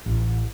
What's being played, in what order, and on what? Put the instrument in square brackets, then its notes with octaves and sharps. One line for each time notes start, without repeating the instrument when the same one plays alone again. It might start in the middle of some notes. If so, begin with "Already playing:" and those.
[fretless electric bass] A1